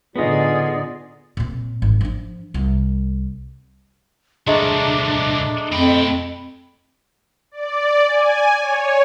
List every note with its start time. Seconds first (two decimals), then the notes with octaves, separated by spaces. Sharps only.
0.16 A2 D3 B3 D#4 F4 G#4 D5
1.37 A#2 C4
1.82 G#1
2.01 F3 D4
2.54 C2
4.47 C2 A#2 G#3 A3 D4 A#5
5.72 F2 A3 G5 B5
7.51 D5
8.07 G#5
8.60 C#5